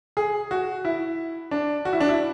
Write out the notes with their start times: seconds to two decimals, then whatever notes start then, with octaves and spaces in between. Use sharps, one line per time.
0.17 G#4
0.51 F#4
0.85 E4
1.51 D4
1.85 F#4
1.93 E4
2.00 D4
2.09 E4